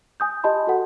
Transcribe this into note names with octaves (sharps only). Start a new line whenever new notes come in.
G#5 D#6 G6
G4 D#5 A5 B5 C6
F#4 A4 F#5